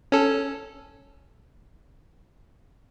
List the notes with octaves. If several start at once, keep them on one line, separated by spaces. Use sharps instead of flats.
C#4 A4